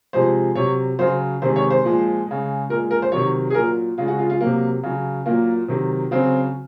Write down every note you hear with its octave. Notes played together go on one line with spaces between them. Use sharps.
C3 F3 G#3 C5
C3 F#3 C#5
C#3 F#3 C5
C3 D#3 G#3 C5
C#5
C5
A#2 F3 G#3
C#3 G#3
A#2 G#3 A#4
A#4
C5
C3 D#3 F#3 C#5
G#4
A#2 F#3 A#4
C#3 G#3 F4
F#4
F4
F4
C3 F#3 A#3
C#3 F#3
A#2 F#3 A#3
C3 D#3 F#3
C#3 F#3 C4